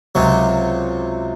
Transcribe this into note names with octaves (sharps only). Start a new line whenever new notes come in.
C#2 C3 F#3